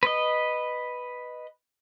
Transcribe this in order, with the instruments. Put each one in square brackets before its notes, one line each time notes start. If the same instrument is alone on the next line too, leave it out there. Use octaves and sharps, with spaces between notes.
[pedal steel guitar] B4 D#5